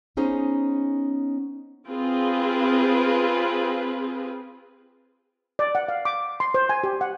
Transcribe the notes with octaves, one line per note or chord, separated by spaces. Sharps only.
B3 C#4 D#4 G#4 C5
C4 F4 G#4 B4
D5
F#5
F5
D6
C6
C5
G#5
G4
F#5